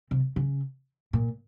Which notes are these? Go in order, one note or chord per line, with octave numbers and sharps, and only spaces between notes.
C3
C#3
A#2